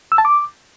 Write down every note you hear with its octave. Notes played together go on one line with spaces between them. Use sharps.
E6
A5
D6